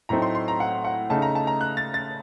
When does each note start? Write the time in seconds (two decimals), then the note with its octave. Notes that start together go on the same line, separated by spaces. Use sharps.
0.09 A2 F#3 A3 C4 D#4 A#5
0.22 C6
0.35 C6
0.48 A#5
0.60 F#5
0.84 F#5
1.10 C#3 A3 D#4 A5
1.22 A#5
1.35 A5
1.47 A#5
1.61 F#6
1.77 A6
1.94 A6